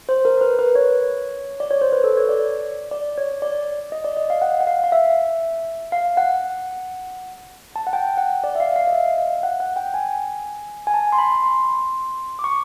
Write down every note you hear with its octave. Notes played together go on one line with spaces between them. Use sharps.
C5
A#4
A#4
B4
B4
C#5
D5
C#5
C5
B4
A4
C#5
D5
D5
C#5
D5
D#5
D5
D#5
F5
F#5
F#5
F5
F5
E5
F5
F#5
A5
F#5
G5
F#5
D5
E5
F5
F5
D#5
E5
F5
F#5
F#5
G5
G#5
G#5
A5
C6
B5
C6
D6
C#6